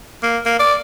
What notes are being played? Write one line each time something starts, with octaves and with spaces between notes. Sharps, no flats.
A#3
A#3
D5